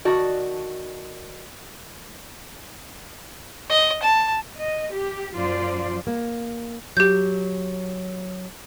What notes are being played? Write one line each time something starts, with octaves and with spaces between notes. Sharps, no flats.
D#3 F#4 D5 A5
D#5
A5
D#5
G4
F#2 F3 F4 C5 D5
A#3
F#3 G4 G6